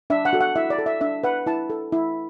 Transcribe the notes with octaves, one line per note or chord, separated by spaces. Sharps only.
D4 E5
F#5
F#4 A4
F#5
E4 E5
D5
A4
E5
D4 E5
B4 F#5
E4 A5
A4
E4